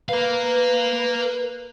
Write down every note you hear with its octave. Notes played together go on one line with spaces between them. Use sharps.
A#4 B4 F5